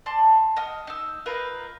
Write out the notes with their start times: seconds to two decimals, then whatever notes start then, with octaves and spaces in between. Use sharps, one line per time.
0.06 D5 A5 C6
0.56 D#5 F#5 D#6 F6
0.87 D#4 E6
1.26 D#4 F4 A#4 B4